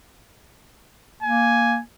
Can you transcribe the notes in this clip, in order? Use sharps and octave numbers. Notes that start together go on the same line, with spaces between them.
A#3 G#5